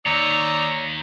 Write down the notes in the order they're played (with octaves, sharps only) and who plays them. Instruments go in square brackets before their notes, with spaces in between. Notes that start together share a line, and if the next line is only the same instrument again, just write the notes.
[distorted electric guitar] D#2 [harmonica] D#4 D5 E6 [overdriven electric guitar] C#5 [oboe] A#5